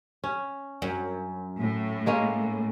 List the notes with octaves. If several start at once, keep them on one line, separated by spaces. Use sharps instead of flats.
C#4
F#2
A2
G#3 A#3 C#4